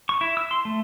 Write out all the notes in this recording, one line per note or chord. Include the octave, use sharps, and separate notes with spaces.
C#6
E4
E6
C6
A3